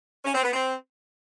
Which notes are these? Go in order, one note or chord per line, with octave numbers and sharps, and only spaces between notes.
C#4
C4
B3
C4